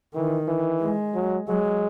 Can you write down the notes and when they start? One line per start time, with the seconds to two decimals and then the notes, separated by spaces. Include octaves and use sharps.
0.15 D#3 E3
0.48 E3
0.81 G#3
1.15 F#3
1.48 F#3 G#3